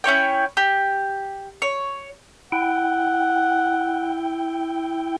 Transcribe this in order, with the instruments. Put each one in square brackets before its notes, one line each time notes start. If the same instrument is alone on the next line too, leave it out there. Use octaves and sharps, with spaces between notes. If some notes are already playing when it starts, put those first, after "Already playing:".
[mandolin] C#4 E4 C#5 G5
G4
C#5
[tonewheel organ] E4 G5 [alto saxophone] F#5